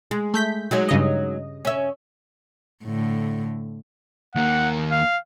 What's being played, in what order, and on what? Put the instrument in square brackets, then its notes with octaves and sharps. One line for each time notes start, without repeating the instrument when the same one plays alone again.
[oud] G#3
[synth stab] A3 G6 B6
[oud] F#3 G#3 D#4
[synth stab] G2 C#3 D#5
[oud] C#4 E5
[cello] A2 D3
[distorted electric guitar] D#2 A#3 [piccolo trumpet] F#5
[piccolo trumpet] F5